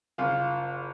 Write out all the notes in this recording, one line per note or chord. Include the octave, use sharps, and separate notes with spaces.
F#1 F4